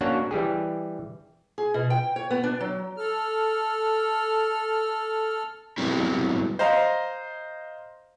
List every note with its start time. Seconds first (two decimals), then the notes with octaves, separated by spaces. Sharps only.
0.01 A#3 C#4 D4 F#4 C#5 F#5
0.31 E3 G3 G4 G#4
1.58 G#4
1.74 B2
1.90 G5
2.16 C#5
2.31 B3
2.44 D4
2.60 F#3
2.97 A4 F6
5.78 F#3 G3 B3 C4 E4
6.59 C5 D#5 F5 A#5